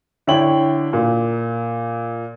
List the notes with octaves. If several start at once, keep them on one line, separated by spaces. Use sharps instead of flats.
D3 E4 C#5 G5 F#7
A#2